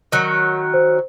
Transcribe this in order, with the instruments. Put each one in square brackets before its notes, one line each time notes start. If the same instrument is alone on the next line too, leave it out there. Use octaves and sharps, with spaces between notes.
[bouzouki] D#3 F#3
[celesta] C5